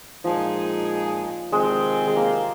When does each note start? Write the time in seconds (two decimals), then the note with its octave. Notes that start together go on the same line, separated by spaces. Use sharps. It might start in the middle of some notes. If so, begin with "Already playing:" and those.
0.24 A#2 F3 G#3 D#4 G#4
1.52 C3 D#3 G#3 C4
2.07 G#3
2.16 A#3